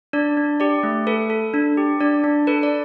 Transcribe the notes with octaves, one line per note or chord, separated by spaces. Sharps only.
D4 D5
D4
G4 D5
A3
A4 B4
A4
D4
G4
D4 D5
D4
A4 B4
D5